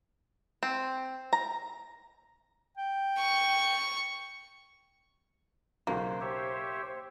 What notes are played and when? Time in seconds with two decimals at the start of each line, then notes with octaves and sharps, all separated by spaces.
0.63 C4
1.33 A#5
2.77 G5
3.19 C#6
5.87 B1 C#3 A#3 F#4 C5
6.21 G4 C5 C#5 E5